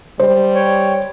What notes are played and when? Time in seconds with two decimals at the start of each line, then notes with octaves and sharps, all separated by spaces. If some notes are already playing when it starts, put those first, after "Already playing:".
0.20 G3 C5
0.55 C#5 G5